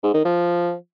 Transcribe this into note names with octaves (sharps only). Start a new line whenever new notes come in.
G#2
D#3
F3